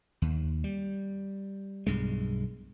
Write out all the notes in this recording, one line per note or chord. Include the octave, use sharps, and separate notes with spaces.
D#2
G3
B1 G2 G#3